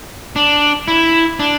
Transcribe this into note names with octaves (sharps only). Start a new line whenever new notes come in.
D4
E4
D4